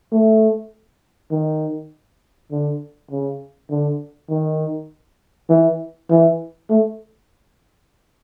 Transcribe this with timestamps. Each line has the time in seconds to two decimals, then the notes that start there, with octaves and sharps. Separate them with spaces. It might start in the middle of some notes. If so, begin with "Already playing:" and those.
0.12 A3
1.31 D#3
2.51 D3
3.11 C#3
3.71 D3
4.30 D#3
5.50 E3
6.10 E3
6.70 A3